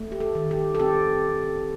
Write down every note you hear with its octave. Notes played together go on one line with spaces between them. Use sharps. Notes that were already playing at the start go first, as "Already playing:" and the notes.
Already playing: A3
G4
A4
D#3
G4
A4
C4 G4